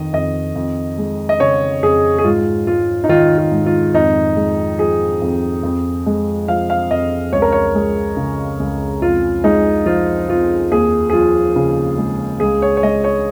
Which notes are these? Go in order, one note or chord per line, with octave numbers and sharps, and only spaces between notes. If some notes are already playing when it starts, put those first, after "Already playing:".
Already playing: F2 D#3 D#5
F2 D#5
F2
G#3
D#5
C#3 C#5
F2 G#4
G#4
G#2 F4
G#3 F4
D#4
D#3 F4
F4
G#2
F4
F2 D#4
G#3
F3 G#4
F2
F2
G#3
F3 F5
F5
F2 D#5
C#2 C#5
A#4
C#5
G#3
C#3
C#2
F2 F4
G#3 D#4
F3 F4
F2 F4
D#2 G#4
G#4
F3 F4
C#3
G#3
C#2 G#4
C#5
C#5
G#3 D#5
C#5